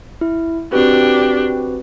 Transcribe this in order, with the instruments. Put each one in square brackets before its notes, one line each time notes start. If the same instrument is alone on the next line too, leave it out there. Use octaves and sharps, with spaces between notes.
[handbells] E4
[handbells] C4 F#4 B4 [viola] D4 G4